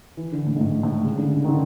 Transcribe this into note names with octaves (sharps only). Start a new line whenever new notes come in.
E3
D3
A2
G#2
A2
A2
C#3
D3
C#3
D#3
D3